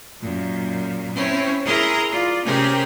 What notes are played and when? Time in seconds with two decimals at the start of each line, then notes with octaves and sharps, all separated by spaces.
0.21 F#2 A#2
1.14 C4 C#4 E4 C#5
1.65 E4 G#4 A#4 A#5 C6
2.11 F4 D5
2.45 C3 C4 C#4 G4 G#4 A#4